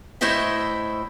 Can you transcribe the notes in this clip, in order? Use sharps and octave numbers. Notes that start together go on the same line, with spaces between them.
A2 A3 E4 C5 D#5 E5